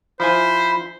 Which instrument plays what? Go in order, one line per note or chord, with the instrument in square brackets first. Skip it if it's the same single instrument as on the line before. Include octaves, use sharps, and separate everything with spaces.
[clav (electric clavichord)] F3 E4 G#5 [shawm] C5 [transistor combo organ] B5